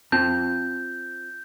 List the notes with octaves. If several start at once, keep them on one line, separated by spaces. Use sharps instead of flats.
C4 F4 A5 G6